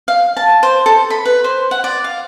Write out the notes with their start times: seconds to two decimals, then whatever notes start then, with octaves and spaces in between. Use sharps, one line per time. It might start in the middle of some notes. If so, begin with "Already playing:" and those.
0.08 F5
0.37 A5
0.63 C5
0.86 A4
1.10 B5
1.25 B4
1.44 C5
1.71 F#5
1.84 D5
2.04 F5